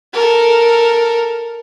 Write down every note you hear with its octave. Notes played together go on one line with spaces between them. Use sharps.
A4 A#4